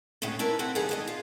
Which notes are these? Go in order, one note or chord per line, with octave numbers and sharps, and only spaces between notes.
D2 A2 G#3 B3 C#4
D4 E4 A#4 B4
C4 B4 F#5
D#2 C#3 G3 B3 G#4 A4
B3 G4 D#5
F4